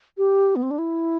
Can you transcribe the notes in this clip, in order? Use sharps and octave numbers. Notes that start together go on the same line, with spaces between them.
G4
B3
C4
D4
E4